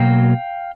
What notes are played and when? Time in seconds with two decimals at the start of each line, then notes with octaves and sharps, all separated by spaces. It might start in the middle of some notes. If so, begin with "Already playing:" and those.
Already playing: B2 F#3 A#3 F5 G5